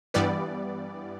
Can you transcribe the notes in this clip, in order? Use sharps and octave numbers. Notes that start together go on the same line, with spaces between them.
G2 E3 G3 B3 D5